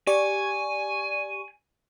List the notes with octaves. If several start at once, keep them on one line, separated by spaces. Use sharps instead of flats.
G4 D5 G#5 C#6